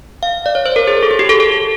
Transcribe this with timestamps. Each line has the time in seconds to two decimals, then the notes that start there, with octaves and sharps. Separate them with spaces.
0.23 F5
0.46 D5
0.55 C#5
0.66 C5
0.76 A#4
0.88 G#4
1.03 A4
1.11 G#4
1.19 G4
1.29 A4
1.40 A4